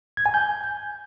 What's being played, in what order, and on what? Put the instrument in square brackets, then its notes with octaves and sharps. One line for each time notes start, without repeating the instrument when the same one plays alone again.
[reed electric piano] G#6
G#5
G6